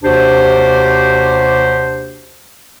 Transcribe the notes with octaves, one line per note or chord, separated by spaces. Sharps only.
D#2 C3 D4 F#4 G4 C5